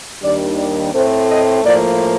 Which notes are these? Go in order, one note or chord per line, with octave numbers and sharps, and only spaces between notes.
D#2 D#3 G3 D4 D5
D5
A2 A3 C4 C5
D#5
A2 F3 A#3 D5